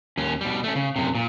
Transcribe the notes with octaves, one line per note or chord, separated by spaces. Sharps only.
D#2 C#4
B2 G3
A3 C#4
C#3
F#2 C3
A#2